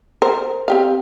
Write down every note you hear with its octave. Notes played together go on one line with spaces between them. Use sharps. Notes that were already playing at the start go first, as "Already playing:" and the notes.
A#4 C5
C4 G4 F5